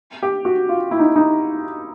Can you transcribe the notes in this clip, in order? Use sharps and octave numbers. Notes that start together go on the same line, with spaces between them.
G4
F#4
F4
E4
D#4
D#4